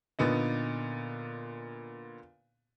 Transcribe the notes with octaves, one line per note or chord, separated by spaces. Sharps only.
A#2 D3 B3 D#4